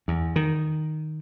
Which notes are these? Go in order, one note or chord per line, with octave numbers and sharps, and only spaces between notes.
E2
D#3